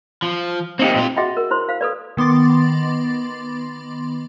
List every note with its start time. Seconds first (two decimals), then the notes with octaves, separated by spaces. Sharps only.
0.22 F3
0.79 A#3 C4 D#4 G4
0.96 A#2 F4
1.17 F#4 G#4 D#5 E5 F#5 G5
1.37 A#4
1.51 E4 C5 C6
1.69 C5 F5
1.81 A4 B4 D5
2.17 D#3 B3 C6 D6 A6